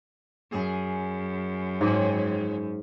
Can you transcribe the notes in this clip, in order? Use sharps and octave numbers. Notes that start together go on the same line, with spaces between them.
F#2 G#4
G#2 C#3 F3 C4